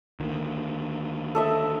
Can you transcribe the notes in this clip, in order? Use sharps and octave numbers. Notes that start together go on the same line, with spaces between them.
D2 D#3
A4 D#5 E5